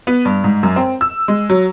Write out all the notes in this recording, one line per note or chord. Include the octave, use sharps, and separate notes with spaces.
B3
G2
G#2
F#2
C4
E6
G#3
F#3